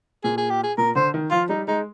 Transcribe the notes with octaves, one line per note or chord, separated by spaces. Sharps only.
A#2 G#4
G#4
G4
G#4
A#2 A#4
D3 C5
D#3
F3 F4
G3 D#4
G#3 D#4